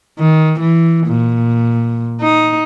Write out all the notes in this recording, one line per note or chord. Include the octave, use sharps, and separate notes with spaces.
D#3
E3
A#2
D#4